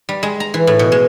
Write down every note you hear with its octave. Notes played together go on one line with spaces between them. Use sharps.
G3
G#3
A#5
E3
A2
B2
G#3